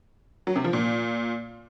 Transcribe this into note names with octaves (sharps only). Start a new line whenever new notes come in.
F#3
C3
F3
A#2